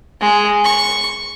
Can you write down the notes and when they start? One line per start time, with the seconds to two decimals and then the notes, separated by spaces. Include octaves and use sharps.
0.20 G#3
0.64 C#6